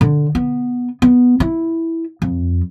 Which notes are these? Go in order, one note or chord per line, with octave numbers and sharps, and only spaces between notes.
D3
B3
B3
E4
F2